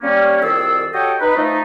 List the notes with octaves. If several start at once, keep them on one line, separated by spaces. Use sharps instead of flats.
G3 A#3 C#4
C2 F2 D#3 G#4 D5 E6
F#4 G4 A4 C#5 D#5 G5
D#4 B4
F3 A3 D#4